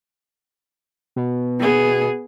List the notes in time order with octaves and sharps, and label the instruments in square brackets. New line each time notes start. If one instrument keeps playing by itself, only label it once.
[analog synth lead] B2
[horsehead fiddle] B3 G#4